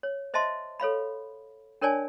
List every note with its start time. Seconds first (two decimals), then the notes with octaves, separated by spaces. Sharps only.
0.03 C#5
0.34 C5 D#5 E5 A5 C6
0.80 A4 C#5 F5 B5
1.82 D4 A#4 C#5 D5 G#5 A5